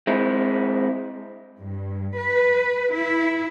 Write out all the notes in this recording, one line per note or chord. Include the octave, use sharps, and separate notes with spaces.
G#3 C4 E4
G2
B4
E4